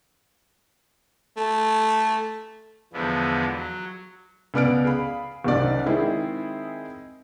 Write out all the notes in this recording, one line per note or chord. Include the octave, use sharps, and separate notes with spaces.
A3
E2 D3 F3 G#3 B3
F#3
C#2 B3 D5 F6 D7
G#4 F5 B5
F#1 C2 D#3 D5
D#3 G#3 C4 E4 G#4